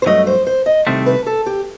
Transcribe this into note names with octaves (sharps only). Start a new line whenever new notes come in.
C5
G2 F#3 A3 D#5
C5
C5
D#5
C2 C3 D#3 A3 C4
B4
A4
G4